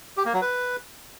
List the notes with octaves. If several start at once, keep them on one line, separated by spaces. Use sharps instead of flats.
G4
A#3
F#3
B4